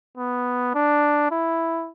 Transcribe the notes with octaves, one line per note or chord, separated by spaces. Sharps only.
B3
D4
E4